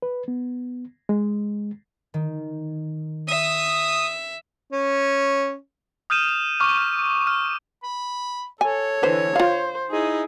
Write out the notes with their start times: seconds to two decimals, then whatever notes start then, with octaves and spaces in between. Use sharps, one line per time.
0.02 B4
0.28 B3
1.09 G#3
2.14 D#3
3.28 E5 D#6
4.72 C#4
6.10 D#6 F6 G6 D#7 E7
6.60 C#6 D6 F6
6.78 F6
7.27 F6
7.83 B5
8.61 A4 C#5 G#5
9.03 D3 E3 B4 C5
9.36 F4 C5 F5
9.90 D#4 E4 G#4